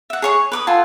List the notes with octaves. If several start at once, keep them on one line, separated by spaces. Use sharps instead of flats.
E5 F#5
G#4 C#5 C#6
B4 D6 D#6
F4 A4 F#5 G#5